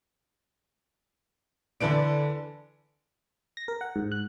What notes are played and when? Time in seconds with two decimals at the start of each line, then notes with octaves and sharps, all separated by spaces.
1.80 D3 E3 D4 A4 B4 D7
3.57 A#6
3.68 A#4
3.81 F#5
3.96 G#2
4.12 F#6